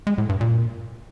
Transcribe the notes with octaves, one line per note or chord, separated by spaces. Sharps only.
G#3
A2
G2
A#2